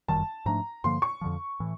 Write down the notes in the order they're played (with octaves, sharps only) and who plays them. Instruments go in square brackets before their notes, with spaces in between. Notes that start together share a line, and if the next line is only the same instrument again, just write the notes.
[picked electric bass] G1 F#2 D#3 G3 [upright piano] A5
[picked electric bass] G#2 F3 A3 D4 [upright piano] A#5
[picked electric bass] G2 D3 F3 A#3 [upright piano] C6
[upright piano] C#6
[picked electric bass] F2 D3 F3
A2 E3